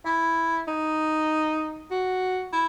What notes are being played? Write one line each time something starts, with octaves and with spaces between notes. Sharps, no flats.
E4
D#4
F#4
E4